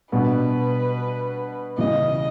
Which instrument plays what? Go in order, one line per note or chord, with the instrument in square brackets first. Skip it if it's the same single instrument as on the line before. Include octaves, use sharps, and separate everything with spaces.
[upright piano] B2 G3 B3 D4 [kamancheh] B4
[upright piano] E2 C#3 E3 G3 [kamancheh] D#5